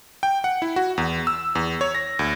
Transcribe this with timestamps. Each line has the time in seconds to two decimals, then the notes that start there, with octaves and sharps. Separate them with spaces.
0.23 G5
0.44 F#5
0.62 E4
0.76 F#4
0.98 E2
1.27 E6
1.55 E2
1.81 C#5
1.95 A#6
2.19 D2